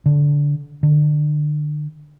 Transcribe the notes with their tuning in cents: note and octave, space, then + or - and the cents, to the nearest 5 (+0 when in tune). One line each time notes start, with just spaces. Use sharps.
D3 -15
D3 +30